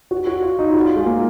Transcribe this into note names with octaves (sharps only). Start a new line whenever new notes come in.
F#4
F#4
F4
D#4
F4
F#4
F4
G#3
A#3